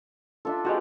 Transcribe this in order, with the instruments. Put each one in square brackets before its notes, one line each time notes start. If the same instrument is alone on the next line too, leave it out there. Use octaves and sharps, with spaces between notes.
[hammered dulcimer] D4 F4 [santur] A4 E5
[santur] G#3 C5 F#5 [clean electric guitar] F#4 G4 B4